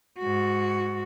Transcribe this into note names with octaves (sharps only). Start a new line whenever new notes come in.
G#2 F#4